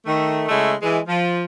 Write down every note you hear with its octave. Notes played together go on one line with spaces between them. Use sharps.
D#3 A3
C#3 G#3 A3 E4
E3 G#3
F3